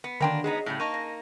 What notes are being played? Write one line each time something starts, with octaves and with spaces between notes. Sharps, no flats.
B3
D3 D#3 F#3 A#3 D4 G5 B5 C6
G#3 B3 D#4 G#4
A2 C#3 G3
A#3 D#4 A5 C#6 D#7
C#3